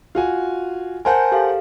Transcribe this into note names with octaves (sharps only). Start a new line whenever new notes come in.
F4 F#4 G#5
A#4 C5 F#5 G#5 A5 G6
G4 A4 F5